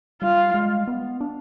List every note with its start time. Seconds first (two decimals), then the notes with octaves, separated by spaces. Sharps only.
0.22 G3 F4
0.54 G#3
0.87 B3
1.21 D4